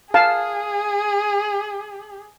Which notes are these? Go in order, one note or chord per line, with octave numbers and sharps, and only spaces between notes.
G#4 F5 A5